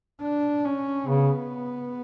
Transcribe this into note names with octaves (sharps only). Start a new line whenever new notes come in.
D4
C#4
C#3 B3